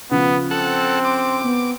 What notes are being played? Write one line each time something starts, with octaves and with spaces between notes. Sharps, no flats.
C#3 F3 B3
C4 A4 F#5
C6 D6
B3